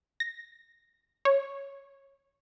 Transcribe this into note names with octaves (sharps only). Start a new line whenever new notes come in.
A#6
C#5